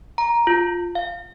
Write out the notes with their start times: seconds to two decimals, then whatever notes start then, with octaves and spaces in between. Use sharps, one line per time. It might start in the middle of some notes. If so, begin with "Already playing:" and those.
0.18 A#5
0.47 F4
0.95 F5